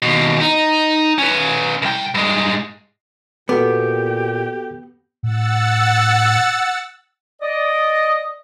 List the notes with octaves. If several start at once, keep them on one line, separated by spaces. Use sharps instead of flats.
D#2 B2
D#4
C#4 B4
C2 G5
G2 G#3
A#2 B3 F#4 G4 A4 D6
A2 F#5 E6 A6
D5 D#5